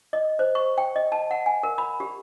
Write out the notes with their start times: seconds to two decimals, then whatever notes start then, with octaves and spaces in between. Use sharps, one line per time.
0.13 D#5
0.39 C5
0.55 C#6
0.78 G5
0.96 D#5
1.12 A5
1.31 F#5
1.46 G#5
1.63 A#4
1.78 B5
2.00 G4